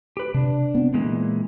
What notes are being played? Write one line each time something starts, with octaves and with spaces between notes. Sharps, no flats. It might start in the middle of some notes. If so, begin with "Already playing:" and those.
G4 B4
C3 D4
B3 C4
A#2 E3 G#3